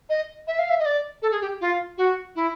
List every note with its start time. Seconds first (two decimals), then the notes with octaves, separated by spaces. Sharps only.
0.09 D#5
0.47 E5
0.59 F5
0.70 E5
0.80 D#5
0.86 D5
1.22 A4
1.32 G#4
1.41 G4
1.61 F4
1.98 F#4
2.36 E4